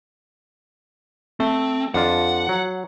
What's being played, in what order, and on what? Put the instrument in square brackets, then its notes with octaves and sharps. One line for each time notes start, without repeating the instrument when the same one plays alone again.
[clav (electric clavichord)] A3 [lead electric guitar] C4
[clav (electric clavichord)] F2 D4 F4 [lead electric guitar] F#5
[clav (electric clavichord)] F#3